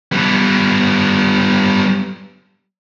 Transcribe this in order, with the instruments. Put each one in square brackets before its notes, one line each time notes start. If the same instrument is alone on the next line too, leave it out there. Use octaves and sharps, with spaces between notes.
[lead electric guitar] G3 B3